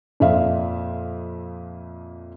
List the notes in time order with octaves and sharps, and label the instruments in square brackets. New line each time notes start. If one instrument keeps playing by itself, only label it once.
[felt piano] F2 A#2 F3 E5 F5